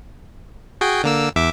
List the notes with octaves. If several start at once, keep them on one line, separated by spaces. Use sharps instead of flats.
F#4 G#4 G5
D3 A#3 E6
E2 E5 D6